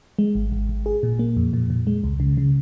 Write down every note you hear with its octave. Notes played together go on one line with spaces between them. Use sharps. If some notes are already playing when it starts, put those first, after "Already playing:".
G#3
G#1
G#1
G#1
G#4
A#2
A#3
F2
A#2
A#2
G#3
C#2
C#3
C#3